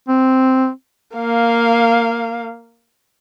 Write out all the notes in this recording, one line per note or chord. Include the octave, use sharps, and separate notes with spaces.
C4
A#3 F5